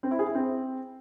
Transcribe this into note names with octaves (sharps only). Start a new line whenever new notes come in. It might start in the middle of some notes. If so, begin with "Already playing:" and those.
C4
E4
G#4
E4
C4